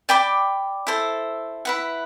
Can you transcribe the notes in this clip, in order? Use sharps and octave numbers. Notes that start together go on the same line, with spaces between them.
D5 G5 B5 D6
E4 A4 C5
E4 B4 F#5